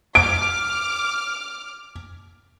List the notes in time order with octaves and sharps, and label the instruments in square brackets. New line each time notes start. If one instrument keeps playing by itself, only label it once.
[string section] D6 F6 [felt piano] D7